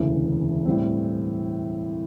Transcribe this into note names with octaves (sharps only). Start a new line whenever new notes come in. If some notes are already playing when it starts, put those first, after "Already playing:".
Already playing: E1 D2 C#3 E3
A2 E3 G3 C4